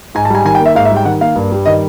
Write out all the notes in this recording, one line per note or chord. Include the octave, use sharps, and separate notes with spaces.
G#2 G#5
A5
G3 G#5
D#3 G#5
G5
A#3
E5
G#2 F5
E5
G3
G5
D#3 F#5
A#3 F5
G2
G3
D#3 D#5